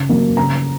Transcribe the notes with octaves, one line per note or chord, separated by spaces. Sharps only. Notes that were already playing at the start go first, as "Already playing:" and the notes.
Already playing: C#3
F#3 A#3
C#3 A#5